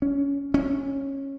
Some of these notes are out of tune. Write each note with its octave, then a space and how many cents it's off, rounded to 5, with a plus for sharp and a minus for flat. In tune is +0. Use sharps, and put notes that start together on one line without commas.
C#4 +15
C#4 -15